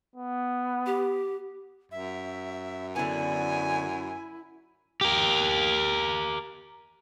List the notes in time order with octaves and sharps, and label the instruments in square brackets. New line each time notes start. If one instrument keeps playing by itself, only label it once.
[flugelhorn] B3
[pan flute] G4
[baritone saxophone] F#2 [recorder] E5
[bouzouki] D3 B3 [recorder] E4 [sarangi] G#5
[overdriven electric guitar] G4 A#4